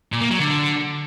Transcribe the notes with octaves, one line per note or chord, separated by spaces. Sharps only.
A#2
A#3
F#3
D3